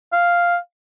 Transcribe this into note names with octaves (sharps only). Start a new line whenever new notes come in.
F5